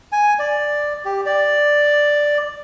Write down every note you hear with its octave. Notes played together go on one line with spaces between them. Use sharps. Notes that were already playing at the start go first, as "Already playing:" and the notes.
G#5
D5
G4
D5